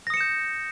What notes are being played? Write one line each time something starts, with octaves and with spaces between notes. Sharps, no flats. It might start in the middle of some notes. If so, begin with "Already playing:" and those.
D#6 G6 A#6 C#7 E7